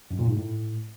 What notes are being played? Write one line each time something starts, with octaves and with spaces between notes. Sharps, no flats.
F#2
A#2
G#2
A2